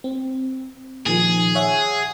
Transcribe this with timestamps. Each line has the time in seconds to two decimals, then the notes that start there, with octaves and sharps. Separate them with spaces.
0.04 C4
1.06 A#2 D#3 F3 G#4
1.55 C#5 E5 F#5